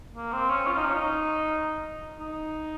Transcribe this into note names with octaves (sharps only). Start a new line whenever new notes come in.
A#3
C4
C#4
F4
D#4
C#4
D#4
D#4